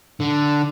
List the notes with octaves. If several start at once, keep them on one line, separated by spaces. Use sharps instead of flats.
D3